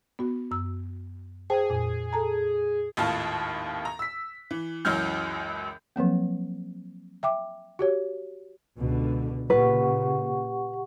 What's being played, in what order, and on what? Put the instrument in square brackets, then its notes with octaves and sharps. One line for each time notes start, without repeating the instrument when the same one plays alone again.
[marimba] B3 F#4
F#2 E6
[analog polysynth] G#4 [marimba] C5 G5 A5
[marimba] F2 A#2
A4 A5 A#5
[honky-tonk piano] G#1 D#2 A2 F4 F5 A5
A#5
E6 B6
E3
C#2 F#2 E3 F#3 F6 G6
[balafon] F3 F#3 A#3 C4
E5 G5 D6
F#4 G4 C#5
[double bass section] C#2 B2 D3
[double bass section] A#2 C#3 [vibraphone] G4 F#5 C#6 [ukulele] B4